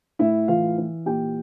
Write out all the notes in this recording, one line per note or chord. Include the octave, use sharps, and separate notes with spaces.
A2 E4 E5
E3 F4 F5
E3
A#2 G4 G5